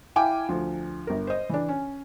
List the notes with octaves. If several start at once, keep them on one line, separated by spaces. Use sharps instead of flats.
E4 F5 G5 G#5 D6
D2 F3
G1 A#4
C5 D#5
E3 D4
C#4